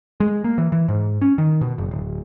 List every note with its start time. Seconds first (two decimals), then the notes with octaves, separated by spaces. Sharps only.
0.20 G#3
0.44 A#3
0.58 E3
0.72 E3
0.88 G#2
1.21 C#4
1.38 D#3
1.61 B2
1.78 F#1
1.91 D1